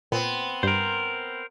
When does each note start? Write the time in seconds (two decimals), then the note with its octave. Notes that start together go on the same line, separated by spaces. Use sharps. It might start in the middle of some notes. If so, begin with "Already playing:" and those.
0.12 A#2 B3 C4
0.63 G2 A#4 C5